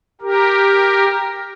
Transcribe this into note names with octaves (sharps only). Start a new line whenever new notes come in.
G4 A#4